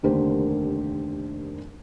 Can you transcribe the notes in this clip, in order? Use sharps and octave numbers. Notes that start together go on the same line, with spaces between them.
F1 D#2 D3 A#3 G4 C5